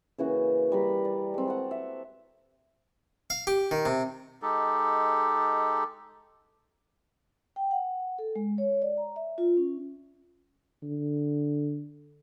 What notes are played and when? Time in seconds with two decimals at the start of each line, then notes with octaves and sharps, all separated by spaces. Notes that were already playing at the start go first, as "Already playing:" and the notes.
0.18 C#3 E3 A#3 F#4
0.72 G3 A#4 B5
1.05 D5
1.34 G#3 C4
1.46 F#4 A4 F#5
1.71 E5
3.30 F5
3.47 G4
3.71 D#3
3.86 C3
4.42 G#3 D#4 G4 A4
7.56 G5
7.71 F#5
8.19 A4
8.36 G#3
8.58 C#5
8.82 D5
8.97 A#5
9.16 E5
9.38 F4
9.57 C#4
10.83 D3